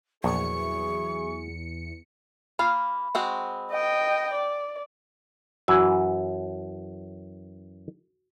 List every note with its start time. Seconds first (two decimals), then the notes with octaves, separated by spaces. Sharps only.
0.24 A#1 E2 F#3 E4 G#4 C#6 C#7
2.59 A#3 F4 F5 B5
3.15 G#3 C4 F#4
3.71 D#5 G5
4.34 D5
5.68 F#2 E3 F#4 G#5 E6